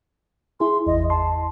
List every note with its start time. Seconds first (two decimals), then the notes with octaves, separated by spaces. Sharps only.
0.60 E4 G#4 C6
0.87 G#1 E2 D#5
1.10 A5 C6